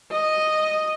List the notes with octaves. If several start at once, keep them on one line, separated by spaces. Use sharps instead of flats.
D#5